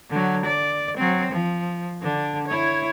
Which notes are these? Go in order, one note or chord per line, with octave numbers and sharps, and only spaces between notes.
D3 F#3
D5
F#3 C4
F3
D3 D4
E4 C#5